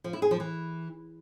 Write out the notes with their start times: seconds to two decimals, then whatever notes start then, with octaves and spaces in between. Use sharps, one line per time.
0.04 F3
0.13 E4
0.22 G#4
0.31 F3
0.40 E3